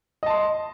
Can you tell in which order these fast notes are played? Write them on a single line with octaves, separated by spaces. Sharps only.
D#5 A5 C6